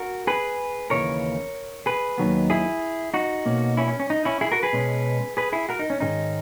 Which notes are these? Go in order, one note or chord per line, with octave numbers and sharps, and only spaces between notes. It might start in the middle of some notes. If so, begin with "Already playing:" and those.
Already playing: F#4 A#4
G#4 B4
D#2 C#3 E3 A#4 C#5
G#4 B4
D#2 D#3 F#3 B3
E4 G#4
D#4 F#4
B2 A#3 C#4
C#4 E4
C#4
C#4
D#4
C#4 E4
E4 G#4
F#4 A#4
G#4 B4
B2 G#3 C#4
G#4 B4
E4 G#4
F#4 A#4
D#4
C#4
G#2 D#3 G#3 C#4 D#4